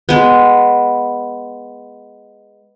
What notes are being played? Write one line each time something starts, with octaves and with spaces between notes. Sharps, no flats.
G#3 B3